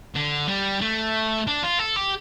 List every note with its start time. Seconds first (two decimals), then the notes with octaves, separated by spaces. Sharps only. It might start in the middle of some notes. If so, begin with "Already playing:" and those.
0.15 D3
0.48 G3
0.81 A3
1.47 D4
1.64 F4
1.79 A4
1.97 G4